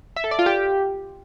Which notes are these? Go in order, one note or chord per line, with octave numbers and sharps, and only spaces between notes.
E5
A4
D5
F4
G4